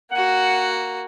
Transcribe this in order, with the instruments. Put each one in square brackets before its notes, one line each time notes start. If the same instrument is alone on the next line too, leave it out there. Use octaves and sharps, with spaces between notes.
[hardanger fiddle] A#3 F#4 [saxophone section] F#5